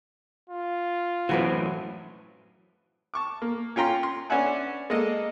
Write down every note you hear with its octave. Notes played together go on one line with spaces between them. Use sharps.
F4
F#2 A2 E3 F#3 B4 C5
A5 C#6 D6
A#3
C#4 F4 G5 A#5 C6
C6
C#4 D4 B4 E5 F#5 G#5
G#3 A#3 A4 D#5